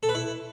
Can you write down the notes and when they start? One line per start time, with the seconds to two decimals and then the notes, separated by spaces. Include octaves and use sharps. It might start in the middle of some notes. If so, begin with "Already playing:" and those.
0.03 A4
0.09 B4
0.15 E4